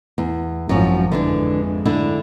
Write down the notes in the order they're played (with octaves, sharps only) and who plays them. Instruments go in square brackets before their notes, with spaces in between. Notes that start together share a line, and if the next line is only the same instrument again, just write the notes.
[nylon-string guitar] E2
[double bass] G#1 F3 [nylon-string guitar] F#2 C#4
[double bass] F2 G#3 [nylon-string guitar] D3 E3 D4
[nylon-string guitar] D3 D4 E4